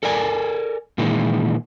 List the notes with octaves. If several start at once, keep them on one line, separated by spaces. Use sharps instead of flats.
A4 A#4 D5 G#5
A#2 D#3 E3 G#3